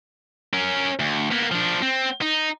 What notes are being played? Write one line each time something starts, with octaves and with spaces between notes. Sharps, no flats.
C#4 A#4
D2
A#3 B3
F3 D4
C4
D#4